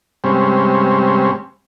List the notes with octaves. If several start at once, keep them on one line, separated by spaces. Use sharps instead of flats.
G2 C3 G3 G#3 C4 C#4